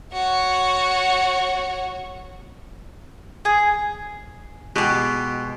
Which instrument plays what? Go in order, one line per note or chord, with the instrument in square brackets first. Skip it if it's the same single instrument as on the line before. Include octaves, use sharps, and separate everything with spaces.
[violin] F#4 C#5
[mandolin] G#4
[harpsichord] B2 [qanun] G#3 G4